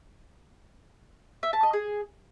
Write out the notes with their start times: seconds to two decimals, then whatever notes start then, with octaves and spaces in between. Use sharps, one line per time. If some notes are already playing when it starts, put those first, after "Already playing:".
1.43 E5
1.53 A5
1.63 D#5
1.73 G#4